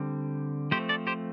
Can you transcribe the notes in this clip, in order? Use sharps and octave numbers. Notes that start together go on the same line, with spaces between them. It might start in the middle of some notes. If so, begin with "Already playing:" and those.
Already playing: D3 G3 C4
F3 A3 C4 G4 C5
A4 D5
G4 C5